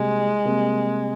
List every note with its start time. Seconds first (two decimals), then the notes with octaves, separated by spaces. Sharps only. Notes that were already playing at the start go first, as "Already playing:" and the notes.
Already playing: C2 C3 G3 G#3 A#3
0.45 C3 G3 A#3